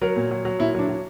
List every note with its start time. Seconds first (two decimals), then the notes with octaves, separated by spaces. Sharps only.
0.02 F#3 A#4
0.16 A#2
0.31 F#3
0.45 F#3
0.59 A#2 E4
0.75 F#3 D4
0.89 F#3